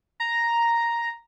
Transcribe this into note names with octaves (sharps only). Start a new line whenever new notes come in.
A#5